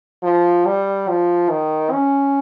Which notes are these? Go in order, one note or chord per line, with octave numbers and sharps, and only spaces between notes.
F3
G3
F3
D#3
C#4